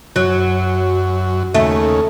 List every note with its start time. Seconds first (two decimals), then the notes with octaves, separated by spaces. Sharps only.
0.16 F#2 F#3
1.54 D#2 C#3 A3